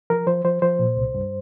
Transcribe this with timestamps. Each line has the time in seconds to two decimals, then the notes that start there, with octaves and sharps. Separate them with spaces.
0.10 F3 A#4
0.27 F3 C5
0.44 F3 C5
0.62 F3 C5
0.79 A#2
0.97 C2
1.15 G2